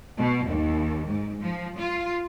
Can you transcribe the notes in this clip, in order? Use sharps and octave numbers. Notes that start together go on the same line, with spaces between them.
B2
D#2
G#2
F3
F4